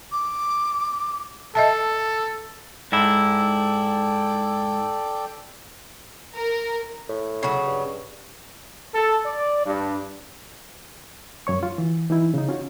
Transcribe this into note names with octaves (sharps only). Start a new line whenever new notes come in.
D6
A4 D#5 E5 A5
G#2 E4 A4 D5 G5
A#4
A2
C#3 F#3
G2
A4
D5
G2
F#2 C#5 C#6
F4
E3
E3 D#4 E4
C#3 D#4
C#4 F4 F#4